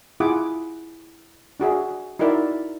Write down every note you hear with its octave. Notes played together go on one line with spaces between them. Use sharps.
E4 F4 G#4 F#5 D6 D#6
D4 F#4 G#4 E5
D#4 E4 F#4 A#4 D5 E5